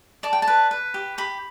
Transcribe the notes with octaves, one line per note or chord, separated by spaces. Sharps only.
D5 A5
G5
A5
B4
B4
G4
G4 B5